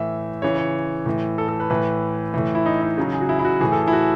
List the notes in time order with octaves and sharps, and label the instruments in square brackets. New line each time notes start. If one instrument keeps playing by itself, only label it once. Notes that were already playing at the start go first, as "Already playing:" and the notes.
Already playing: [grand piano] A2 E3 E5
C#3 E3 C#5
C#5
A2 E3
A4
A4
B4
A2 E3 B4
A2 E3
E4
D#4
D#4
C#3 F#3
G#4
F#4
E4
E4
F#4
A2 E3 G#4
A4
G#4
E4
F#4